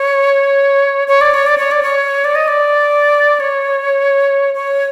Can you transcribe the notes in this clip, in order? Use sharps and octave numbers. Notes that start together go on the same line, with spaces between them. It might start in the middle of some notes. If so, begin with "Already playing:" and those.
Already playing: C#5
C#5
D5
C#5
D5
C#5
D5
C#5
D5
D#5
D5
C#5
C#5